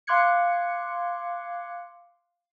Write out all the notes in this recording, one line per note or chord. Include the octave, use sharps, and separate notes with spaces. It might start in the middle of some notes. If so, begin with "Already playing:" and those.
F5 C6 D6 F#6 G#6 C#7